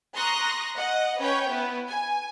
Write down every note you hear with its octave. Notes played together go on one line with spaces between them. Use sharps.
A#5 C6 C#6 D#6 F#6 A#6
D#5 F#5
C#4 B4 C#5 G5
B3 E4 B4
G#5